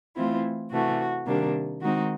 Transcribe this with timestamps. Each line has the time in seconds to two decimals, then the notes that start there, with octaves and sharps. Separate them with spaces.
0.16 E3 A3 C4 E4 F4
0.71 C3 E3 A3 F#4
1.26 C3 D#3 G3 A#3 D4
1.81 D#3 G#3 C4 D#4 F#4